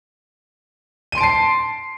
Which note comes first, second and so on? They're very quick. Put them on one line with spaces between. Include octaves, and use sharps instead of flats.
D#7 C6 D7 A5 C7